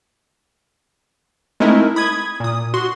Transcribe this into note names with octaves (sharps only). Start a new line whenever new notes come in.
G#3 A3 C4 D#4 E4 A#4
B5 D#6 G#6
A#2 D#6
F#4 C6